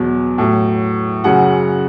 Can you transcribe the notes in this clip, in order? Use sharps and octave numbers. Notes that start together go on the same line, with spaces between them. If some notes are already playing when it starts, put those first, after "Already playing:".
Already playing: E2 B2 F#3
A2 F#3
F#2 C#3 F#3 F#5